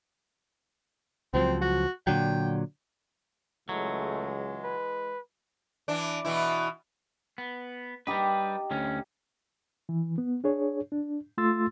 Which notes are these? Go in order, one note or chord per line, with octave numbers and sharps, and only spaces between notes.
C#2 F3 F#3 C4
F#4
A#2 D3 F#3 G5
C#2 E3 F#3 G#3 A3
B4
E3 D4
B2 E3 E4
B3
G3 D#4 G4 B4
D2 C#4
E3
B3
D4 G#4 C#5
D4
A3 F4 C6 E6 A6